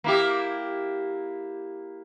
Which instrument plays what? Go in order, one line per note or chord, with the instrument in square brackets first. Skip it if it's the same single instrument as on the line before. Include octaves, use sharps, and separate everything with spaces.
[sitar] A#3 E4 G4